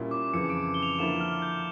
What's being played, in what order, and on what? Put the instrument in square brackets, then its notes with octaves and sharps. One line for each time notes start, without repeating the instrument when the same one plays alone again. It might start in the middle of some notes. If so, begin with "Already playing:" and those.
Already playing: [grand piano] A#2 G3 C#4 E4
[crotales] D6
[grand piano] F2 C#3 E3 [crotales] C#7
[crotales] D7
G7
F7
[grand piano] D3 F3 A#3 E4 [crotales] E7
[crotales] F6
G6